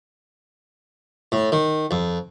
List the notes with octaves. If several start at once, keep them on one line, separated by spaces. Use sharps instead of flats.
A2
D#3
F2